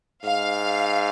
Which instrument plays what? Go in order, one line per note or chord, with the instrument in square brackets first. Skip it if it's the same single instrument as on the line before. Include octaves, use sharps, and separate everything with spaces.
[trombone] G#2 [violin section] F5